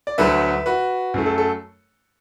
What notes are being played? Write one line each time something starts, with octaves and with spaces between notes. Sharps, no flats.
D5
D2 D3 F#3 A3 B4 E5
F#4 B4
F#2 F#3 A3
A4
A4